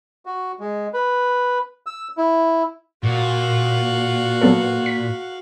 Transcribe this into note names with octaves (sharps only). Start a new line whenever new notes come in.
F#4
G#3
B4
E6
E4
A#2 F#4 F5 F#5
F#3 B3 A4
B6